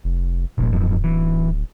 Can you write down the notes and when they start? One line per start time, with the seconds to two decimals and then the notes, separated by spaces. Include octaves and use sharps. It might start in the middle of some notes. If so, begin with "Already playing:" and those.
0.04 F1
0.58 E1 A#1 A#2
0.73 D1 F#2 F3
1.04 E3